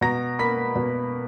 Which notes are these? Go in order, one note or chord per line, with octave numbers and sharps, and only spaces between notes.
B2 A#5 A#6
A#3 B5 B6
B2